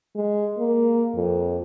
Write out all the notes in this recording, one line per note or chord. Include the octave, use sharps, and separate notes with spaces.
G#3
A#3
F2